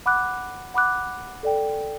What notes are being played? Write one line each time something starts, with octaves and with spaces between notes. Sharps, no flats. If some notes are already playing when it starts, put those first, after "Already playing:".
F#5 B5 D6 F#6
F#5 B5 D6 F#6
A4 D5 G5